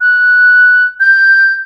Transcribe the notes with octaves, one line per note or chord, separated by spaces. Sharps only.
F#6
G6